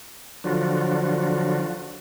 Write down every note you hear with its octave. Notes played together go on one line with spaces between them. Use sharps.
D3 F3 F#3 D4 F4 F#4